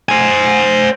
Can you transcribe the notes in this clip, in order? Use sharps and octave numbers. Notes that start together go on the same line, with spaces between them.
C5 G#5